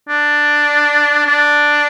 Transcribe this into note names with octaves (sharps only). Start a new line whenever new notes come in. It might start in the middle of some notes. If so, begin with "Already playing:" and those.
D4
D4